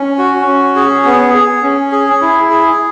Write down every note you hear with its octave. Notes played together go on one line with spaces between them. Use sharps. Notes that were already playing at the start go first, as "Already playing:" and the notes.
Already playing: C#4
F#4
C#4
G#4
B3
G#4
C#4
G#4
E4
G#4